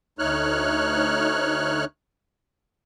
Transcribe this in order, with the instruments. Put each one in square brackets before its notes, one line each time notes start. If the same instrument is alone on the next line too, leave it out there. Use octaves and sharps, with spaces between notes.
[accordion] D2 A3 D#4 C#5 F6 F#6